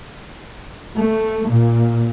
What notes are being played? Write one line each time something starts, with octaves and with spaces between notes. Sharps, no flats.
A3
A#2